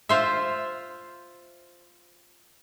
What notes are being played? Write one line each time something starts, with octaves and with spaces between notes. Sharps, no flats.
F4 C5 E5